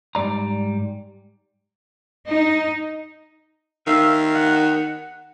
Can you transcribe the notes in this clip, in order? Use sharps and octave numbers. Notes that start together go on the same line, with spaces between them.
G#2 G3 D5 A#5
D#4
D#3 E5 F5
F#5